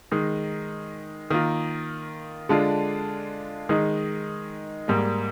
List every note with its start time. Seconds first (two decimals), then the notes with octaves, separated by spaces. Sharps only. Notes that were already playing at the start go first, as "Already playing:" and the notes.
0.11 D#3 G#3 D#4
1.30 D#3 A#3 F4
2.49 D3 G#3 D4 F4
3.69 D#3 G#3 D#4
4.88 G#2 G3 A#3